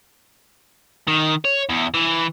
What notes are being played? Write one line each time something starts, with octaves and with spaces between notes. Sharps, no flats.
D#3
C#5
E2
E3